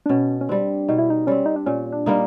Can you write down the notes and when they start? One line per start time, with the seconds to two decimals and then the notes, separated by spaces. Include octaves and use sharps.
0.06 D4
0.09 B2 C#4
0.41 C#4
0.49 G3 C4 D4
0.89 B2 D#4
0.98 E4
1.10 D#4
1.27 G3 C4 C#4
1.46 D#4
1.56 D4
1.66 A#2 C#4
1.93 D4
2.06 G3 A#3 D#4